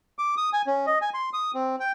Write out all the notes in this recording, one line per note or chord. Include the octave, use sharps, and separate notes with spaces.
D6
D#6
G#5
C#4
D#5
G#5
C6
D#6
C4
G5